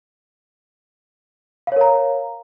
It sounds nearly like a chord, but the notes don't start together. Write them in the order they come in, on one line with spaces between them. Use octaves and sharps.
F5 C#5 A#4 A#5